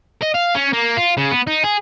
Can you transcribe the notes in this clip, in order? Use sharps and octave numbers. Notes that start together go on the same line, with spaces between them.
D#5
F5
C#4
A#3
F4
C#3
B3
D#4
G#4